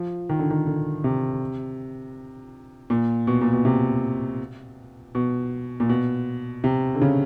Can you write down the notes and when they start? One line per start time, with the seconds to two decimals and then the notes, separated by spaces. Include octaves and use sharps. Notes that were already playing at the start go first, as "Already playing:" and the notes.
Already playing: F3
0.29 D#3
0.39 D3
0.51 D#3
0.67 D3
1.04 C3
2.90 A#2
3.27 B2
3.41 A#2
3.53 B2
3.65 C3
5.15 B2
5.80 A#2
5.89 B2
6.64 C3
6.95 D3
7.01 C#3